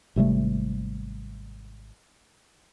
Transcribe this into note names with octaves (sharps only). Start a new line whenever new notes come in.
G#1 C3 G3 A3